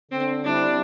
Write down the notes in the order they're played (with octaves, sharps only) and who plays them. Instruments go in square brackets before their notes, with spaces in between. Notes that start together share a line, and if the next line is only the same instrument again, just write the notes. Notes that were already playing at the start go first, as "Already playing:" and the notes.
[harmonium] D3 [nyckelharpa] C4
[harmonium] G3 C4 E4 [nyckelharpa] D4